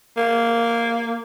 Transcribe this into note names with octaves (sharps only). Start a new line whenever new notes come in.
A#3